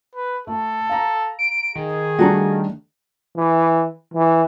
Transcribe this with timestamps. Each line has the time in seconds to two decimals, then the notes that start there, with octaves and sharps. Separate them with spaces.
0.15 B4
0.47 A3 A4
0.89 F5 A#5
1.39 D7
1.76 D#3 G#4
2.19 G3 A3 D4 F#4 A4 A#5
3.37 E3
4.14 E3